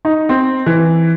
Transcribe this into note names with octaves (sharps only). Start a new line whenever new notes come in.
D#4
C4
E3